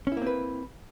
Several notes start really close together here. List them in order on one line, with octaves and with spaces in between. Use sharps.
C#4 E4 A#3 C4 B4